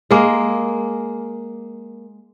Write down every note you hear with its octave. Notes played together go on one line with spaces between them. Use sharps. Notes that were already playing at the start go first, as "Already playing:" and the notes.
G#3 A#3